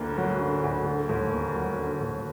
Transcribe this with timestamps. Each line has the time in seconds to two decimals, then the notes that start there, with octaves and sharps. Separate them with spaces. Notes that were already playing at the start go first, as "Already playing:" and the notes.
Already playing: D2 D3 A#3
0.17 F#3
0.40 D3
0.64 D2
0.86 D3
1.09 D#2
1.32 A#3
1.55 F#3
1.78 D3
2.01 D#2